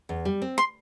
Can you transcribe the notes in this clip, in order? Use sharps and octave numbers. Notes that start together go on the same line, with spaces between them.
E2
G3
C4
C6